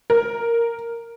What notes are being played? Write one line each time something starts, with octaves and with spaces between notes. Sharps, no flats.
A#4